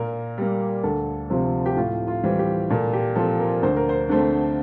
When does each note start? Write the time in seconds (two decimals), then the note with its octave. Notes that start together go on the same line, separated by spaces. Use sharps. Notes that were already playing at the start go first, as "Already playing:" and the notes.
Already playing: A#2 A#4
0.38 G3 A#3
0.83 D2 A4
1.30 C3 F3 C4
1.66 G4
1.76 A2 F4
2.07 F4
2.23 E3 G3 C4
2.39 G4
2.70 A#2 A4
2.93 G4
3.16 F3 C4 A4
3.39 A#4
3.62 D2 C5
3.76 A#4
3.89 C5
4.09 D3 A3 C4